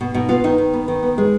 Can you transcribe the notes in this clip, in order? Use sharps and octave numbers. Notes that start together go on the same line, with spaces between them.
B2
B2 D#4
B3 F4
D#3 D#4
D#3
B3
D#3
B3
G#3